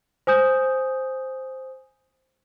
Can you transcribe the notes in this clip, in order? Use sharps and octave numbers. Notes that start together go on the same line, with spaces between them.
C5 G#5 D#6 G6